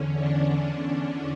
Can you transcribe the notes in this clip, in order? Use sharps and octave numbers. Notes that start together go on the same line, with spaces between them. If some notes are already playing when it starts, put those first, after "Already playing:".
Already playing: E2 D3 C#4
D4